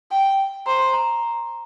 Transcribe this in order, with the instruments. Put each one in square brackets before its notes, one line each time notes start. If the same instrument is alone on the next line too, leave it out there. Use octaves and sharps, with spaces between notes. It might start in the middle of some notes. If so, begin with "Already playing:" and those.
[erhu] G5
[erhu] C5 [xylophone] A#5
[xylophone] A#5